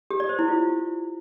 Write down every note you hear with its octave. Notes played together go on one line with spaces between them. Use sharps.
G4
D5
C5
E4
F4